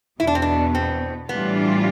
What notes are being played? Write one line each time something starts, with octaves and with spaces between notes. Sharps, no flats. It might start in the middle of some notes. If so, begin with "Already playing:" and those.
E2 B2 B3 E4
D4
C4
D4
C4
A2 E3 G3 B3 D4 F4